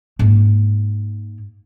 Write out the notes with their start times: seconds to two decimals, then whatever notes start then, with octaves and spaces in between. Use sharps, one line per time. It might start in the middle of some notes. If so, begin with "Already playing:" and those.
0.19 G#2 A#3